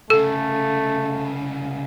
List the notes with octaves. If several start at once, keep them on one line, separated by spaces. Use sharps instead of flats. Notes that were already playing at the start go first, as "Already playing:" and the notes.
C2 C#3 A3 A4